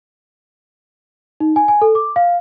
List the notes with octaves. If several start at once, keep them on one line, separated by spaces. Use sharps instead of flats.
D#4
G#5
G#5
A4
D6
F5